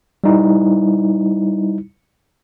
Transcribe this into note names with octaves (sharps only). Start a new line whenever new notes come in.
G3 D#4 E4